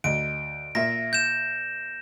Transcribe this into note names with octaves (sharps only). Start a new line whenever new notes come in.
D2 D#5 D7
A#2 E5 A#6
G6 E7